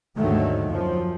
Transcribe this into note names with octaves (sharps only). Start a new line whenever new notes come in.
D#2 G#2 D3 D#3 F#3 A3
F#2 F3